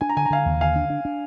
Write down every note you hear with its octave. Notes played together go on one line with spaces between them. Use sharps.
D4 G#5
A#5
D3 G#5
A#5
D3 F5 G#5
D#2
D3 F5 G#5
D4
D4
D4